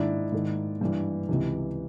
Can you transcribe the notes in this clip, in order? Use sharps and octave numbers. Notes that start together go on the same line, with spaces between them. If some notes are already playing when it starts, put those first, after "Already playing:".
Already playing: G#2 D#3 D4 E4
G#2 D#3
G2 E3
C#2 C3 E3